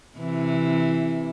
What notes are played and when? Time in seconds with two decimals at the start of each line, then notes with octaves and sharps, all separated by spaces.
0.18 C3 E3